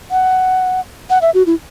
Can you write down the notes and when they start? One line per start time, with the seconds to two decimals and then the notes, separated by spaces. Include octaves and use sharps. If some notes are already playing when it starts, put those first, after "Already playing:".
0.11 F#5
1.10 F#5
1.22 E5
1.34 F#4
1.46 E4